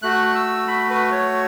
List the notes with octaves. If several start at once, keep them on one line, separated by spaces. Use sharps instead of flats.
A3 F#4 F#6
E6
B5
B4
C#5